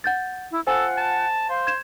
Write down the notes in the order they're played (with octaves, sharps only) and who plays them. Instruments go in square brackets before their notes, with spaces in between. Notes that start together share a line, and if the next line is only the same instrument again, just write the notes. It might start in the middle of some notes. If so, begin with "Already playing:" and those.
[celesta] F#5 G6 A6
[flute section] E4
[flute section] F4 F#5 [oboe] A4 [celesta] C5 G#5
[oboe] A5
[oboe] C5 [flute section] F5
[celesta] G#6 E7